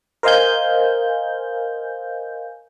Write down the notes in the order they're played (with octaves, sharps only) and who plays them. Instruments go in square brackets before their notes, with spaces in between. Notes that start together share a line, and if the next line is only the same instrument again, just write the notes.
[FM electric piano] A#4 C5 D#5 F5 G#5 G6